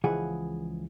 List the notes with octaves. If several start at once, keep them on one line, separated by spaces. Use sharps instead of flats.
C#2 E3 F3 G#4 F#5